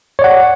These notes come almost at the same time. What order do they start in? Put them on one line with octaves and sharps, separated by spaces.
C#5 D5 F#5